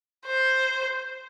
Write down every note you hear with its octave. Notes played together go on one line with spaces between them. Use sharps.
C5